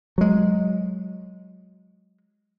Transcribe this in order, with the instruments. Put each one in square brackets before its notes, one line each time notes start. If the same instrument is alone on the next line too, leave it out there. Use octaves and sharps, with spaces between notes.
[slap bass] F#3 G#3